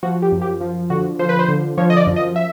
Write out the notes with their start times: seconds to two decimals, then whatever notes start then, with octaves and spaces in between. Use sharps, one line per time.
0.03 F3 F#4
0.22 G4
0.32 F#2
0.42 G4
0.61 F3
0.90 D3 F#4
1.19 F3 C5
1.29 B4
1.39 C5
1.48 D3
1.78 F3 C#5
1.90 D#5
1.97 D5
2.07 F#2
2.16 D#5
2.36 E5